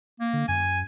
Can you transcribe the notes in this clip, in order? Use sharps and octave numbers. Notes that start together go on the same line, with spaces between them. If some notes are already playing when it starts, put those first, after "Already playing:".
A#3
D3
F#2 G#5